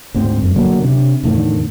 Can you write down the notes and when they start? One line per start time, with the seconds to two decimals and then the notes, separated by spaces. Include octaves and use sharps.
0.14 D2 G#2 C4
0.42 F#2
0.56 D3 F#3 A#3
0.83 C3 D4
1.23 E2 A2 D3 D#3